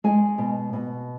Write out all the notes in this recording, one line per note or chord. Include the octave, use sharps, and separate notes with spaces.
G#3 G#5
B2
B2